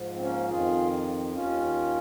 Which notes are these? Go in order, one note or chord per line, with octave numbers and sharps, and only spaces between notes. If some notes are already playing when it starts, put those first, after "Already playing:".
Already playing: G#2 F3
C4
A#3 C#4
F2 D#3 F4 G#4
D#2 D#3 C#4 F4